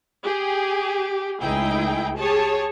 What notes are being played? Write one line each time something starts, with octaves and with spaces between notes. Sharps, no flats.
G4 G#4
C#2 A3 D#4 E4 G#4 G5
G4 G#4 C#5 A5